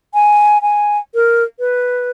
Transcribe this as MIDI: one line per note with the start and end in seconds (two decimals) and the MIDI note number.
0.14 0.62 80
0.62 0.98 80
1.15 1.44 70
1.60 2.11 71